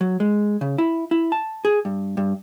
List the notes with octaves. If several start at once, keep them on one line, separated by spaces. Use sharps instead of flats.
F#3
G#3
C#3
E4
E4
A5
G#4
G2
G2